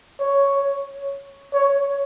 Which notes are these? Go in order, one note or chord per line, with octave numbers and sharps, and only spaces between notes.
C#5
C#5